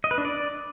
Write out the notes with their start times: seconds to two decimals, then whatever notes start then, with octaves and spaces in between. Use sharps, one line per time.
0.04 D#5
0.11 B4
0.18 D4
0.25 D5